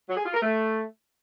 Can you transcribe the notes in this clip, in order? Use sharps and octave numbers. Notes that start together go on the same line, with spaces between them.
F#3
G#4
F4
A#4
A3